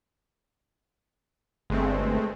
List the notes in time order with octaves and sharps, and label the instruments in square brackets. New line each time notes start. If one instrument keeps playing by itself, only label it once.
[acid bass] G1 [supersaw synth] G#3 A3 C4